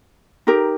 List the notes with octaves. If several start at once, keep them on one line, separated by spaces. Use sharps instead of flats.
D#4 G4 A#4